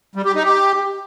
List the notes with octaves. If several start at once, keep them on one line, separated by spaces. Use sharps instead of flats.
G3
G4
D#4
G4